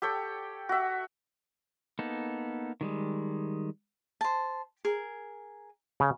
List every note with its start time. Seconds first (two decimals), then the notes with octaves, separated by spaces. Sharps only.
0.02 G4 A4 C#5 G5
0.69 F#4 E5
1.99 A#3 B3 D#4 A4
2.81 D#3 G3 G#3
4.21 C5 A5
4.85 G#4 A#4
6.00 C#3